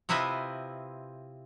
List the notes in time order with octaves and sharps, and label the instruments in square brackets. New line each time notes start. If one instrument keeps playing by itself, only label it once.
[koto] C3 C4 E4 F4 B4 D#5